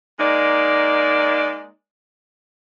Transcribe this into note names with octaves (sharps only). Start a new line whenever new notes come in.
G#3 A#3 D#4 D5